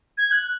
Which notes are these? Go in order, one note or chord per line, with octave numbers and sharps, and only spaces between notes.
G#6
F#6